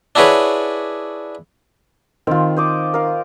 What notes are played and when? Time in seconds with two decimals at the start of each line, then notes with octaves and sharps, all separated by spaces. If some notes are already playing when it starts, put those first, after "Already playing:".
0.15 D4 E4 F#4 G#4 B4 C#5
2.27 D#3 C4 F4
2.57 C5 D#5 D6
2.94 A#4 F5